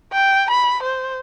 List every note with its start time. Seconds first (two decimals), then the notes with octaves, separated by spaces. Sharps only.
0.12 G5
0.50 B5
0.82 C5